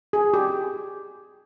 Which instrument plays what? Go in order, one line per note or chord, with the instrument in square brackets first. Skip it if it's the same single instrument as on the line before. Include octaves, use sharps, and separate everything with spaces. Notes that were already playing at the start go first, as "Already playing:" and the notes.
[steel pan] G#4
G4